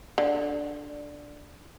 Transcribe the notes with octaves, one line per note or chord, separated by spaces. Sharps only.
D3